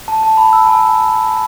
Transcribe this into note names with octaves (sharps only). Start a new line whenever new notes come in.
A5
A5
B5
E6
G#5